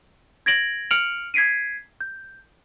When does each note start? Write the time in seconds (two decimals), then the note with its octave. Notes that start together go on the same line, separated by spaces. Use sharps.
0.46 G#6 A#6 D7 F#7
0.91 F6 C#7 D7 F7 F#7
1.34 G#6 B6 C7 D7 D#7
2.01 G6